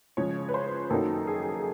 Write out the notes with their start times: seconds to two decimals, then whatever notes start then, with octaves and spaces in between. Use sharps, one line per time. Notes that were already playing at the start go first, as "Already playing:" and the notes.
0.17 C#3 F3 G#3 C#4 C#5
0.49 B4
0.54 C5
0.90 F#2 D#3 F#3 A#3 D#4 A4
1.27 G#4